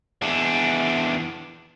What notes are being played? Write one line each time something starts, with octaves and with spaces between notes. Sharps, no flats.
E2 D4